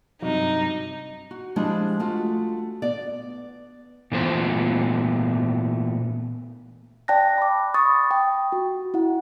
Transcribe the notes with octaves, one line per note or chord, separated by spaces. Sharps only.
G2 C3 F#3 D#4
F#4
F3 G3 G#3 D4 E4
A3 F4 F#4
B3 D5
A#2 E3 A3 B3 C5
D5 G5 A5 F#6 A#6
B5 D6
B5 C#6 D#6 A6
G5
F#4
E4 F#5